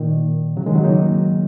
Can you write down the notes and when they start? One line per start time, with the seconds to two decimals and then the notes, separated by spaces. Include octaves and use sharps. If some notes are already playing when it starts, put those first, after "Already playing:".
Already playing: A#2 D#3
0.57 C#3 F#3
0.66 D#3 G#3
0.75 C#3 F#3
0.84 A#3 D#4